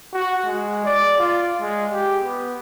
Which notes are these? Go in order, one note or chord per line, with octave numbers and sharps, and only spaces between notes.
F#4
G#3
D5
F4
G#3
G4
B3